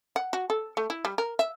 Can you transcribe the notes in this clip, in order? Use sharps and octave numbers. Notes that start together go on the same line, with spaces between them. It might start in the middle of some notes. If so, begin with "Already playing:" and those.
F#5
F#4
A4
A3
E4
G3
A#4
E5